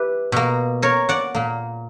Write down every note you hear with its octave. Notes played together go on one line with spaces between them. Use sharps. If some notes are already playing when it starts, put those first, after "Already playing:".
Already playing: E4 G4 B4
B2 A#3
A#4 C#5
D5 F#5
A#2 A#3